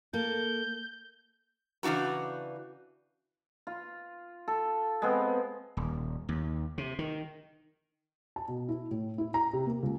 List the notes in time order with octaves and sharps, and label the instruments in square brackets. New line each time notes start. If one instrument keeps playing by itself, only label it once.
[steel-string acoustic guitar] A#3 A4 [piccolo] G6
[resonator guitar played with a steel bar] C#3 E3 D4 F#4 A#5
[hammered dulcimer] F4
A4
G#3 B3 C4
[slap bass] D#1
D#2
C3
D#3
[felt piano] A5
B2
E4
A2
E4
A#5
C3
A#3
C#2